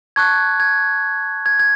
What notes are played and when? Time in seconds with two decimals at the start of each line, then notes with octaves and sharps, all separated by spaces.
0.16 A5 C#6 F#6 G#6
0.60 G#6
1.46 G#6
1.59 G#6